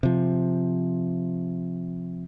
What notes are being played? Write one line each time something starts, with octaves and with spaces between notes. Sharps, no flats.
C3 F3